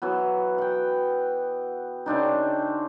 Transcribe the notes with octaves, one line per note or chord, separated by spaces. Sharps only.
E3 F#3 B3
F#5 G5
C#3 C4 D4 D#4